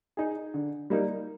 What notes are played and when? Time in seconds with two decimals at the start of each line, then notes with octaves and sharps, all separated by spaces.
0.17 D#4 G#4
0.54 D3
0.90 G3 A#3 D#4